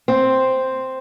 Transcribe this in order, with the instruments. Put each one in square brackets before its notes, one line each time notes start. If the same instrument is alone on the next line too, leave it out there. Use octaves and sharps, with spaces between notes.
[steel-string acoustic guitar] C4